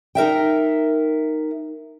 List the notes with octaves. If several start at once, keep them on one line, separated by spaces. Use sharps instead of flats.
D#4 A#4 E5 G5